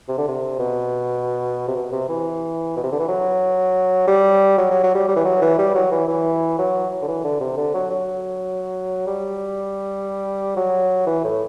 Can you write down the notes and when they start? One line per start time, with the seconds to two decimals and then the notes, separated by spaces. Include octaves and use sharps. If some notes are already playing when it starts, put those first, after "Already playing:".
0.08 C3
0.18 D3
0.28 C3
0.59 B2
1.68 C3
1.76 B2
1.92 C3
2.09 E3
2.76 B2
2.83 C3
2.92 D3
3.00 E3
3.08 F#3
4.08 G3
4.58 F#3
4.71 F#3
4.83 F#3
4.95 G3
5.08 G3
5.16 E3
5.25 F#3
5.42 E3
5.58 G3
5.75 F#3
5.92 E3
6.08 E3
6.58 F#3
7.02 D3
7.08 E3
7.24 D3
7.40 C3
7.57 D3
7.74 F#3
7.90 F#3
9.07 G3
10.57 F#3
11.07 E3
11.24 A2